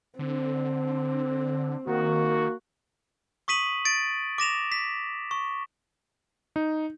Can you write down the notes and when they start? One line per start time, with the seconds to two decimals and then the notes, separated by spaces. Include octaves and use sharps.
0.19 D3 C4
1.87 D#3 A#3 F#4
3.48 C#6 D#6 B6 D#7 F#7
3.85 A6 D7
4.38 D6 A#6 E7 F7
4.72 B6
5.31 C#6
6.56 D#4